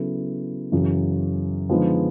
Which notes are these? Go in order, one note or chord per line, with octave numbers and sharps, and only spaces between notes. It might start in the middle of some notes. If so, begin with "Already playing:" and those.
Already playing: C#3 F#3 B3 E4 A4
F#2 C#3 E3
D3 F3 G#3 B3 D#4